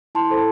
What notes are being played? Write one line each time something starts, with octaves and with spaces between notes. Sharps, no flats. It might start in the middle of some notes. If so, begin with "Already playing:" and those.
E4 A5 C6
A4 C5